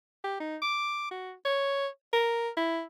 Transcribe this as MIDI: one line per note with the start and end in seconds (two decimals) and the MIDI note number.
0.24 0.40 67
0.40 0.57 63
0.62 1.06 86
1.11 1.33 66
1.45 1.87 73
2.13 2.49 70
2.57 2.82 64